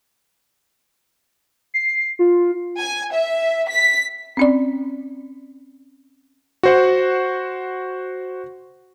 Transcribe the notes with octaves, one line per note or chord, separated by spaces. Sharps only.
C7
F4
G#5
E5
B6
C4 C#4 D5
F#4 C5 F#5